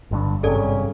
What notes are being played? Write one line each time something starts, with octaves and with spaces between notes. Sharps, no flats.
G1 G2 D3
G#1 G2 C3 C#4 G#4 A4 D5